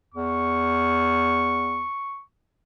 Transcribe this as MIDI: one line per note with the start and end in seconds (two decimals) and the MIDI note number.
0.15 1.89 40
0.15 2.23 85